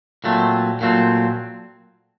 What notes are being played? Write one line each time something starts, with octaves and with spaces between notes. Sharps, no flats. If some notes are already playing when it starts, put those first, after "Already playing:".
A#2 F#3 A3 C4
A#2 F#3 A3 C4